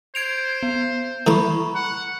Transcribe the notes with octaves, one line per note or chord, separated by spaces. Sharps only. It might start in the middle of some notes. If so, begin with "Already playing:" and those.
C5 G#6 D7 F7
B3
E3 A3 A#5 B5 C#6 D6
F#5